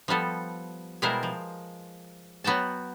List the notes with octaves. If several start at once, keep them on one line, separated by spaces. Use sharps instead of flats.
F3 G3 B3 A4
B2 G3 G#3 E4 A#4 C5
F3
F#3 B3 F#4 G5 A5